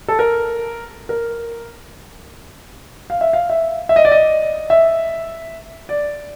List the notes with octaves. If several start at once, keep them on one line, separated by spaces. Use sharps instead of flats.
A4
A#4
A#4
F5
E5
F5
E5
E5
D#5
D5
D#5
E5
D5